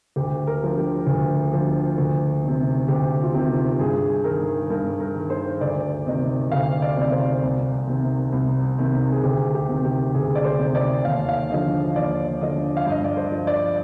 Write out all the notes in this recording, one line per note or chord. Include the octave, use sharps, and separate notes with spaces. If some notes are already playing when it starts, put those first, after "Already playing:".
D2 G4
A#4
D3 F3
G4
D2
D3 F3
D2
C3 D#3
D2 G4
F4
C3 D#3 G4
G2 G#4
D#3 A#4
G2 A#4
A#4
D#3
C5
D2 D5
C3 D#3 D#5
D2 F5
D5
C3 D#3 D5
C5
C2
C3 D#3
C2
C3 D#3
G#4
D2 G4
G4
C3 D#3
G4
D2 G#4
D5
C5
C3 D#3
D5
D#2 F5
F5
D3 F3 D#5
D#2 D5
D3 F3 D#5
F5
G2 D#5
D5
C5
F3
D5